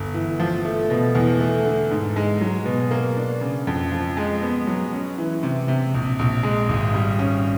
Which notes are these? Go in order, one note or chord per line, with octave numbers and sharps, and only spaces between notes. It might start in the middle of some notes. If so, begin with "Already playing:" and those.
Already playing: G1
E3
F3
A3
B2
E2
A3
D3
G#2
G#3
F#3
B2
A#3
D4
C#3
F2
F3
G#3
B3
F#3
C#4
E3
C3
C3
A#1
A#1
G#3
G#1
G3
C#4